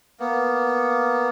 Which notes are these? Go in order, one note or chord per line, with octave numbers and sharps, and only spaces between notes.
A#3 B3